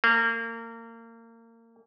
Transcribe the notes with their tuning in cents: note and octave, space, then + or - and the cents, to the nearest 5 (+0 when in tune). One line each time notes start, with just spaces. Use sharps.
A#3 -30